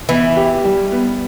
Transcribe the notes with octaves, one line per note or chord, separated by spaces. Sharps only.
E3 B3
G4
G3
B3